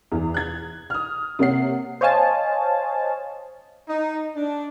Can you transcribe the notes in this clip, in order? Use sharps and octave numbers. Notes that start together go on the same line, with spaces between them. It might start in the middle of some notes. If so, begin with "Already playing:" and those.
E2 E3
F#6 G#6
D#6 F6
C3 A#3 C#5 F#5 C7
C5 C#5 D#5 F5 G#5 A5
D#4
D4